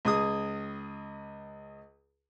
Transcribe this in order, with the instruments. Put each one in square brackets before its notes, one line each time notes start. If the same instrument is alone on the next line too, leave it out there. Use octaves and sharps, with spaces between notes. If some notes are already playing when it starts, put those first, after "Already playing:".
[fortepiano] C#2 G#4 D#6